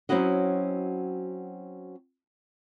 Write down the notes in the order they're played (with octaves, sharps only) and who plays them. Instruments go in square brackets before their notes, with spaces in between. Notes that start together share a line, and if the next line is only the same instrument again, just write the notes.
[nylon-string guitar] F#3 C4 C#4 E4 F#4 D#5